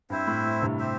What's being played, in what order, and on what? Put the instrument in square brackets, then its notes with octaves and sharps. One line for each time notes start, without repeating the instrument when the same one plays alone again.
[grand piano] G2 [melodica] C4 E4 C5 E5
[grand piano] A2
A2
G2 C3
[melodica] C4 G4 C5 E5